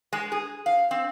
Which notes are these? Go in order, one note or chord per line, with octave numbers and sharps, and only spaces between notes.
G#3
G#4
F5
C4